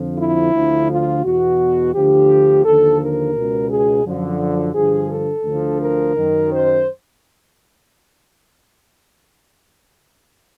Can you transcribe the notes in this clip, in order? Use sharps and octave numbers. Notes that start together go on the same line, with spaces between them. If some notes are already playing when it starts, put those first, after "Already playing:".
Already playing: F2 D3 F3
E4
D2 D3 F3
F4
E2 B2 F#4
D2 D3 F3 G4
D#2 D3 F3 A4
A#4
C#2 B2
G#4
F#2 D3 F3
G2 D3 F3 G#4
A4
D2 D3 F3
A#4
F#2 D#3
C5